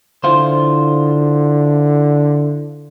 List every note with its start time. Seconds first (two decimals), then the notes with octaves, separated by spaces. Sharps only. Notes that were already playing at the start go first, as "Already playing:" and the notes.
0.24 D3 E4 F4 C5